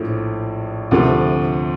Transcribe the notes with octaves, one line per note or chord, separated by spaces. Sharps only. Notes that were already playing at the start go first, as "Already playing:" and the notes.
Already playing: A#1 A2 F3 A3
D2 C3 F3 A3